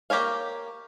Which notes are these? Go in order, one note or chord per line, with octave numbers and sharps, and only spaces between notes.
A#3 G4 A#4 C#5 F5